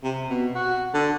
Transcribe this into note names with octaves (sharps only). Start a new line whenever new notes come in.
C3
B2
F#4
D3